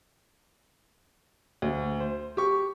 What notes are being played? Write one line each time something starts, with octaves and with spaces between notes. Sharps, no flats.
D2
C5
G4 C#6